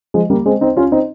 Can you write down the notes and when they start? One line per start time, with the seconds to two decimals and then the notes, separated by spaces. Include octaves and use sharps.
0.14 F3 G#3
0.30 G3 A#3
0.46 G#3 C4
0.61 C4 D#4
0.77 C#4 F4
0.92 C4 D#4